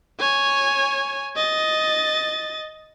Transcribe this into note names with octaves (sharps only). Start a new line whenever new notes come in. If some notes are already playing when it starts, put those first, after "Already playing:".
C#5 G#5
D#5 A6